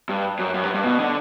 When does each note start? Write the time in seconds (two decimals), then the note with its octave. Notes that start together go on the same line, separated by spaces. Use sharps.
0.09 G2
0.39 F#2
0.54 F#2
0.64 G2
0.74 G2
0.84 B2
1.00 D3